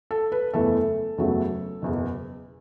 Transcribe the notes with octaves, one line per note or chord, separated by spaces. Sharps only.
A4
B4
F#1 E2 E3 A3 A4
F#1 E2 C#3 F#3 A3
F#1 E2 B2